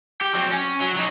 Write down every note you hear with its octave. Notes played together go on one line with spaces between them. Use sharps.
G4
F#3 C4
C#4
F#3
F#3 D#4